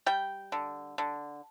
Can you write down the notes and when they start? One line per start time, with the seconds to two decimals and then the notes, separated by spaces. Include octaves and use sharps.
0.06 G3 G5
0.52 D3
0.98 D3